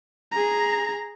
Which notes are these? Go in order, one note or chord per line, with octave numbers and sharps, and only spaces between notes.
G#4 A#5